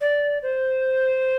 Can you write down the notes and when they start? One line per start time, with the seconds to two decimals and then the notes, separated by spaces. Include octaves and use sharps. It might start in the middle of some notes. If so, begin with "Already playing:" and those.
0.01 D5
0.43 C5